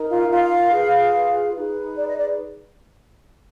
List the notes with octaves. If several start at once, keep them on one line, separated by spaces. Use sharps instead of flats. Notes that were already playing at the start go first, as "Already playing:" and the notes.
Already playing: D#4 A#4
F4 F5
F4 F5
F4 G#4 B4
D#4 G#4 B4
D5
D#5
D5